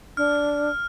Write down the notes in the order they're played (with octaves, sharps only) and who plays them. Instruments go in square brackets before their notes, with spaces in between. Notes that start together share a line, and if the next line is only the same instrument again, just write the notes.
[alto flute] D4 [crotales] F6